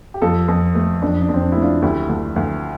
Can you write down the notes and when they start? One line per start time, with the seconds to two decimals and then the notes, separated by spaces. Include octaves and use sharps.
0.14 G4
0.22 F2 F4 A4
0.48 F2
0.75 A3
1.02 F2 D4
1.22 D4
1.29 F2 C4
1.42 D4
1.52 A3 E4
1.62 D4 F4
1.82 D2 E4 G4
2.09 D2
2.36 D2